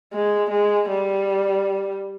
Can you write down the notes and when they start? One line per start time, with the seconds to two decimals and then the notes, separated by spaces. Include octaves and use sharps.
0.13 G#3
0.51 G#3
0.89 G3